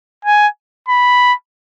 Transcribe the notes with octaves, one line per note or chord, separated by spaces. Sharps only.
G#5
B5